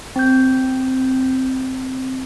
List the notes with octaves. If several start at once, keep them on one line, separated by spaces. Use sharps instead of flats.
C4 G6